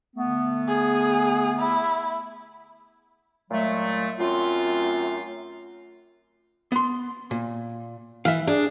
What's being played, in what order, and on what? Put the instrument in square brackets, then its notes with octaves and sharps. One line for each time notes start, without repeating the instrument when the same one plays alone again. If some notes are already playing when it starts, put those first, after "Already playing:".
[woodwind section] D3 A3 B3
[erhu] G#4
E4
[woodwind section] A#2 F#3 G#3 A3
F#2 A3 C4 F4
[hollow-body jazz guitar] B3 C6
A#2
[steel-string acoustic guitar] E3 [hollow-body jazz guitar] E5 F5
[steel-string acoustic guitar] D4 G#4